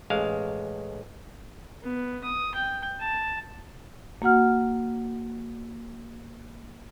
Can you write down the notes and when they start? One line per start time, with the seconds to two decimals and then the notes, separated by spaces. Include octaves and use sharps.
0.10 A1 G#3 F5
1.83 B3
2.23 D#6
2.55 G5
3.00 A5
4.22 A#3 F#4 F#5 F6